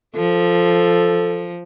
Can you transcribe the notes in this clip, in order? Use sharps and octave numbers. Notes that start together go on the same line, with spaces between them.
F3 A4